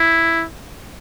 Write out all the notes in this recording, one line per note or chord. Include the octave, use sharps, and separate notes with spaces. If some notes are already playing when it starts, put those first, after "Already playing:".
Already playing: E4